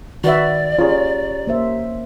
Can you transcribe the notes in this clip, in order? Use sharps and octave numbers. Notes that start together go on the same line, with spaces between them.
D#3 F#4 B4 D5 E5
C#4 F4 G4 G#4 C#5 A#5
A#3 C5 E5